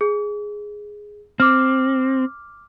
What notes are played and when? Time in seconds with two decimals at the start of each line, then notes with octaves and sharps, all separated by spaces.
0.01 G#4
1.40 C4 D6 F6